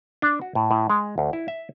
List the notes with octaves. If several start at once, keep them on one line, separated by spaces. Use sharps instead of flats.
D4
F#4
A2
A2
G#3
D2
E4
E5